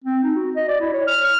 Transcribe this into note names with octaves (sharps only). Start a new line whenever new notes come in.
C4
D#4
F#4
D#5
D5
E4
C#5
F6
F6